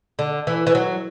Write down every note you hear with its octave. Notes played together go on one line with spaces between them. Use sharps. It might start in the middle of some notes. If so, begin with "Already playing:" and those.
D3
E3
E3
F#3